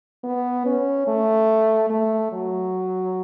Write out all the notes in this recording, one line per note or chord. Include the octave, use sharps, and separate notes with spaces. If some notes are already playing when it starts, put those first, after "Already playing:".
B3
C#4
A3
A3
F#3